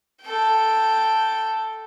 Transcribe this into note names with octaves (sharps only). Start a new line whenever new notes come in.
A4 G5